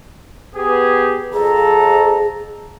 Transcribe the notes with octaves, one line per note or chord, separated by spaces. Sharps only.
B3 G4 G#4
F2 G#4 A4 A#5